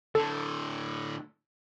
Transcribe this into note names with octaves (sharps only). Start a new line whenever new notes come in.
A2 D3 A4